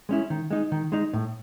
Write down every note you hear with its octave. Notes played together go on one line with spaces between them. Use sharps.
G#3 C#4 E4
D#3
G#3 D#4
D#3
G#3 D#4
A2